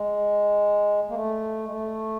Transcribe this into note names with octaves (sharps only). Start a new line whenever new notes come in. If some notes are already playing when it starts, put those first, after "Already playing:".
Already playing: G#3
A#3
A3
G#3
A3